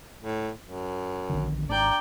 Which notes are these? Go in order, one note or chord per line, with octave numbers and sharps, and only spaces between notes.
A2
F#2
A#1 D3 D#3
G#1 D4 D5 G5 A#5